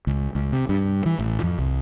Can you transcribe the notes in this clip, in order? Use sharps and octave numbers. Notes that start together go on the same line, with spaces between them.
C#2
C#2
C3
G2
E3
A1
F2
C2